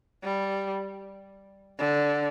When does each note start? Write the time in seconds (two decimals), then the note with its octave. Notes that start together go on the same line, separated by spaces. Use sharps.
0.24 G3
1.79 D3